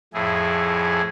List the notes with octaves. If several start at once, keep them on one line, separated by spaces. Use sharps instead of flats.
F2 A2 E4 G#4